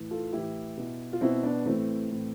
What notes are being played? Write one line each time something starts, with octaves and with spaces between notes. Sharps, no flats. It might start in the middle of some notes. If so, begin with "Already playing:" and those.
Already playing: A2 E3
F4 A4
A2 E3 E4 G4
B2
F4
B2 C4 E4
B3 D4
A2 E3 A3 C4
A2 E3